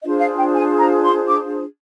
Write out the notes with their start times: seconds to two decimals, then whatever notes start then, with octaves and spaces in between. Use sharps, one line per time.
0.03 D4 F4 G#4 C5 D#5
0.20 F5
0.37 G5
0.54 G#5
0.78 A#5
1.04 C6
1.28 D6